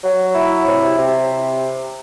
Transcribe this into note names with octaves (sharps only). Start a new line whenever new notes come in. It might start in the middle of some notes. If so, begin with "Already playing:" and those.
F#3
E4
C3
C3